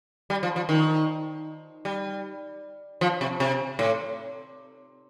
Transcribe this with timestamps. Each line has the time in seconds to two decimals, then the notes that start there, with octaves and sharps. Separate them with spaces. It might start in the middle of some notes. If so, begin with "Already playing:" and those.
0.30 G3
0.43 F3
0.56 F3
0.69 D#3
1.85 G3
3.01 F3
3.21 C3
3.40 C3
3.79 A2